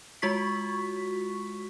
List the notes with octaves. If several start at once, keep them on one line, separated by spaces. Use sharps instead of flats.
G#3 F4 F#4 C#6 B6